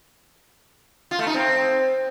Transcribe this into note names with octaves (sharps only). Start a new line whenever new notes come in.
F4
A3
D#4
C4